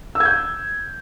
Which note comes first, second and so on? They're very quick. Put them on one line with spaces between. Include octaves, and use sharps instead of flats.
E6 G#6 G6